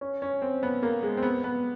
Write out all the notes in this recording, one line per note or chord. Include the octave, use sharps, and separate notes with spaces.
C#4
C#4
C4
B3
A#3
G#3
C4
B3
B3